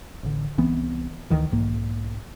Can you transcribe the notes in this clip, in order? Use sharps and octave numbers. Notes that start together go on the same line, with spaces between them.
A1 D3
C2 E3 B3 C4
D2 D#3 E3
B1 G#2 A#3